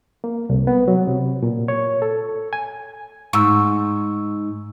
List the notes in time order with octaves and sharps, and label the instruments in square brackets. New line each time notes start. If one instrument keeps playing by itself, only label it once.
[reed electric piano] A#3
C2
B3
F#3
C3
A#2
C#5
A4
G#5
[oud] G#2 [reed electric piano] C#6 E6